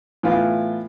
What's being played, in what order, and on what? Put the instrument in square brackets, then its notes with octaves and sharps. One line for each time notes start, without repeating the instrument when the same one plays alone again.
[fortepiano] A2 E3 B3 F4